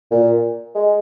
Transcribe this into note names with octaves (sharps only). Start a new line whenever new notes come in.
A#2
G#3